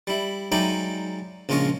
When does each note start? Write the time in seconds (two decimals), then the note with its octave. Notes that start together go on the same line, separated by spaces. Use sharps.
0.07 G3 E4
0.52 F#3 G#3 D#4 E4 D5 G5
1.49 A#1 C#3 G#3 F4 D#5 C#6